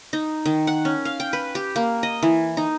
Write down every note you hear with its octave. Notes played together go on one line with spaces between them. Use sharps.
D#4
D#3
F#5
C#4
F5
G5
B4
G4
A#3
D#5
E3
D#4